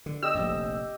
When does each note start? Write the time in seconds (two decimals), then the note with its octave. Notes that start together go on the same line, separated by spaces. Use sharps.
0.06 D3
0.23 G4 D#5 E6
0.35 F1 A#1 F2